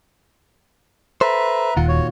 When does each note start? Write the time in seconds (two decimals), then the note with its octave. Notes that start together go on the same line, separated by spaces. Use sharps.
1.21 A4 B4 C5 E5 A#5
1.76 D#1 A#2 D#3 F4 F#5
1.88 F#4 C#5